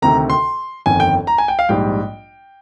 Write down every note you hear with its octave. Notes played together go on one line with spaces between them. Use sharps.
D2 C3 D#3 A#5
C6
G1 F2 D#3 G#5
G5
A#5
G#5
G5
F5
A#1 G#2 G3 G5